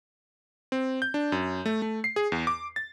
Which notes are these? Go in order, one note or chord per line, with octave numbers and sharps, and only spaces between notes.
C4
G6
D4
F#2
A3
A3
C7
G#4
E2
D6
A6